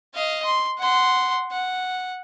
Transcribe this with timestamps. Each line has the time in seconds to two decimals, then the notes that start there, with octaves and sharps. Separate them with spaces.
0.15 D#5 F5
0.45 C6
0.78 F#5 C6
1.51 F#5